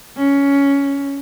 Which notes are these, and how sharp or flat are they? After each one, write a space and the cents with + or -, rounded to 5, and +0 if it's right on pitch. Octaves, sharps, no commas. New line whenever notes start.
C#4 +10